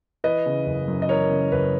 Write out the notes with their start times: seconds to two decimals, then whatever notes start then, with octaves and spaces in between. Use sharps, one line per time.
0.24 E3 B4 D#5
0.46 C#3
0.66 F#1
0.88 F#2
1.02 D#5
1.09 E3 A#4 C#5
1.30 C#3
1.51 F#1 B4